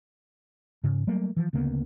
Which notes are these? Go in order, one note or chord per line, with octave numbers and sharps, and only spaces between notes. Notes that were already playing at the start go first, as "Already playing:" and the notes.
G#2 C#3
F#3 G3 A3 A#3
E3 F3
D2 C#3 A#3 B3